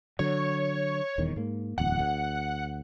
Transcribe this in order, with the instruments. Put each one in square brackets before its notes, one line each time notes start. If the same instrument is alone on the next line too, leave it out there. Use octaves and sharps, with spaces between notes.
[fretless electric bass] D3 F#3 [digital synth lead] C#5
[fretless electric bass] D#1 E2 D#3
G#2 A#3
[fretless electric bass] D1 E2 [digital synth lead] F#5
[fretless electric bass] D2